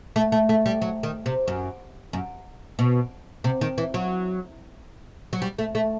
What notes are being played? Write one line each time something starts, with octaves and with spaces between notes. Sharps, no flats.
A3
A3
A3
G3
F#3
D#3
C3
F#2
F#2
B2
C3
D#3
E3
F#3
F#3
G3
A3
A3